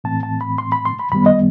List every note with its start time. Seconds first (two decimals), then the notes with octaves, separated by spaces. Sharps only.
0.04 A2 E3 A3 C4 A5
0.23 A5
0.41 B5
0.58 C6
0.72 B5
0.85 C6
0.99 B5
1.12 F#2 D#3 G3 B3 B5
1.26 D#5